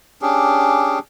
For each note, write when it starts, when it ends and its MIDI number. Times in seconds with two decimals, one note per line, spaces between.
0.22 0.99 61
0.22 0.99 62
0.22 0.99 67
0.22 0.99 68